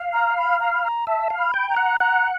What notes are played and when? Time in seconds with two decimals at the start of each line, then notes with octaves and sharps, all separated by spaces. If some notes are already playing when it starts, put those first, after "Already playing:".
Already playing: F5
0.13 A#5
0.37 B5
0.60 A#5
0.73 B5
0.84 A#5
1.07 E5 A5
1.30 F5
1.38 B5
1.54 G5 B5
1.69 A#5
1.76 F#5
2.00 F#5 A#5